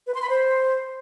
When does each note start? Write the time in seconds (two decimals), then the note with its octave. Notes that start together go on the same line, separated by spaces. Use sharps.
0.07 B4
0.15 C6
0.22 B5
0.30 C5